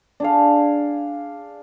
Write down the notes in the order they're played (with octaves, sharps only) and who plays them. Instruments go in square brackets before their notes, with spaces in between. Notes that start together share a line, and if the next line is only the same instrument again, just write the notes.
[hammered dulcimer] D4 G#4 F5